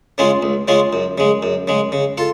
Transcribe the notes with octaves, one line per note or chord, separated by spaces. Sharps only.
C#3 G#3 C#4 F4
C#2
C#3 G#3 C#4 F4
F#2
C#3 G#3
F#2
C#3 G#3
C#3
F4 A4